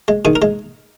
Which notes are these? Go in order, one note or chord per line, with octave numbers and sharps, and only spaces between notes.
G#3
D#3 G#4
A#4
G#3